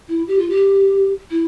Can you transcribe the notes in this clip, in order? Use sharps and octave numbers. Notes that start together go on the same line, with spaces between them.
E4
G4
F4
G4
E4